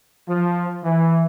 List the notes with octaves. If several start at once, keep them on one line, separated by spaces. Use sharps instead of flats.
F3
E3